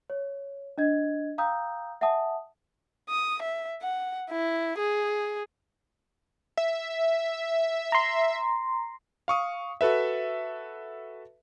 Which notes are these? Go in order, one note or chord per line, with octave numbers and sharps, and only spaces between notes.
C#5
D4 D#5 G#6
F5 G5 A#5 D#6 E6 G6
E5 F#5 G#5 A5 D#6
D#6
E5
F#5
E4
G#4
E5
A#5 C6
F5 C#6 D#6
F#4 A4 B4 E5